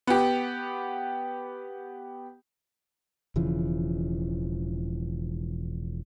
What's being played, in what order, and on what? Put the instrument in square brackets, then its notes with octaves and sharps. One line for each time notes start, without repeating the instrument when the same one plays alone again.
[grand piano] B3 G4
[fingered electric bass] E1 C#3 E3 F3